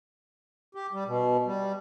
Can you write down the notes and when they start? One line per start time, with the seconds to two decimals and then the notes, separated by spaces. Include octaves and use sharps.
0.75 G4
0.93 G3
1.07 B2
1.46 G3